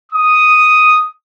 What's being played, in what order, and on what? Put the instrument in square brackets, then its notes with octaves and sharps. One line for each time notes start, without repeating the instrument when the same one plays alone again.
[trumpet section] D#6